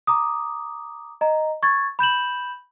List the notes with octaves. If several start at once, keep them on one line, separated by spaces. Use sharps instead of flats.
A#5 D6 D#6
D#5 A#5
C#6 G#6 A6
B5 G6 E7 F#7